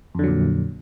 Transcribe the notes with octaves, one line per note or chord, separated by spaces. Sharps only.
F2 A#2 D3 F#3